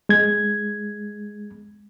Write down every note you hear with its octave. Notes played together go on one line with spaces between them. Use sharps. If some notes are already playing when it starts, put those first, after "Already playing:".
G#3 G#6